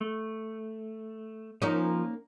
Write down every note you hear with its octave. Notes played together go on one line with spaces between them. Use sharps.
A3
F3 A#3 C#4 D#4